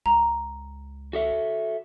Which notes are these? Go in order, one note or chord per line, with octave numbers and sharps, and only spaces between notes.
C#2 A#5
F#4 A4 E5